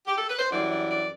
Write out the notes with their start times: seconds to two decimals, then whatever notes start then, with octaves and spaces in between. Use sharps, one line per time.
0.07 G4
0.17 A4
0.29 B4
0.39 C5
0.50 F#2 E3 G3 D5
0.70 D5
0.90 D5